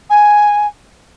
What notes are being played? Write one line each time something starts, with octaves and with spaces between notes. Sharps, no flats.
G#5